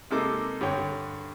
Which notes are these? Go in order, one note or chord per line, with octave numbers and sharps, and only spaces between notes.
C3 G#3 A#3 D#4 A4 D6
G2 D3 C#5 G5